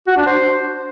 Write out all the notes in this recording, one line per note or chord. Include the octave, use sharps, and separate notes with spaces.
F#4
D4
C5